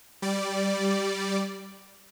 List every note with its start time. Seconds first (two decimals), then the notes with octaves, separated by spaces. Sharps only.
0.22 G3 D5